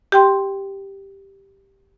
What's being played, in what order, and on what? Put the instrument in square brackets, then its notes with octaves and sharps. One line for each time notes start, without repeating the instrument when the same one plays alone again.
[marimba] G4 G5 C6